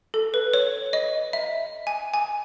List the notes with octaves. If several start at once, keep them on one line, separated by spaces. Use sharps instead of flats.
A4
B4
C#5
D#5
E5
G#5
G#5